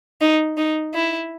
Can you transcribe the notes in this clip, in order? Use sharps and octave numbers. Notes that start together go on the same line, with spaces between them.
D#4
D#4
E4